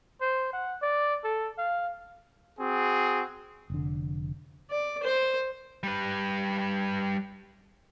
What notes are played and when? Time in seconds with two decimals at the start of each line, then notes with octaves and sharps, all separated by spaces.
0.21 C5
0.53 F#5
0.82 D5
1.24 A4
1.58 F5
2.59 C4 F#4 G#4
3.70 F1 D3
4.70 D5
5.03 C5
5.83 G3 B4